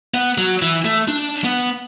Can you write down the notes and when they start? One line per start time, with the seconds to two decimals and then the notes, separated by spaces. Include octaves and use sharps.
0.14 B3
0.38 F#3
0.62 E3
0.85 A3
1.08 D4
1.44 B3